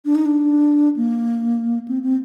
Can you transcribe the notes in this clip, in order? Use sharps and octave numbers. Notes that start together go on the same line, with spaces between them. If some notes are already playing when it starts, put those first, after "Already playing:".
D4
D#4
D4
A#3
C4
C4